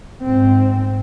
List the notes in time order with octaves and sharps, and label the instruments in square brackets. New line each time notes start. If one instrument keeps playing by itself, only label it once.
[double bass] G#2 C4